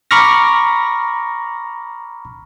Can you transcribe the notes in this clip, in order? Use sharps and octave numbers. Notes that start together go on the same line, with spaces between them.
A#5 B5 C#6 D6 F6 A#6